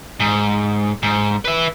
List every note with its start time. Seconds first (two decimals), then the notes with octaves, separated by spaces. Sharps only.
0.20 G#2
1.03 G#2
1.45 B4 E5